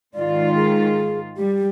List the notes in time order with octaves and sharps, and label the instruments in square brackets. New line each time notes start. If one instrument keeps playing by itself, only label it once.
[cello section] G#2 D#3 F4 [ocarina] D5
[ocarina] G#4
[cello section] G3 [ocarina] G4